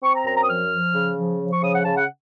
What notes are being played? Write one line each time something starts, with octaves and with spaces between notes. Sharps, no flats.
C4 C#6
A#5
F#2 A#5
A#5
D#6
F3 F6
F3
C#3
F3
F3
C#6
C#3 D#6
F#5
C#3 A5
F#5